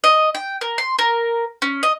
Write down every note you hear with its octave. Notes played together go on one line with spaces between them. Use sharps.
D#5
G5
A#4
C6
A#4
C#4
D#5